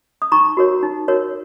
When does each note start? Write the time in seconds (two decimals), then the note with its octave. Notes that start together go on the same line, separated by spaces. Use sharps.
0.22 D#6
0.32 D#4 A#5 C#6
0.57 F#4 A#4 C#5
0.83 D#4
1.08 F#4 A#4 C#5